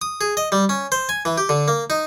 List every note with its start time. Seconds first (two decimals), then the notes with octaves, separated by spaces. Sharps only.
0.02 D#6
0.21 G#4
0.37 D#5
0.52 G3
0.69 C#4
0.92 C5
1.09 G#5
1.25 E3
1.38 G4
1.49 D3
1.68 A#3
1.90 D#4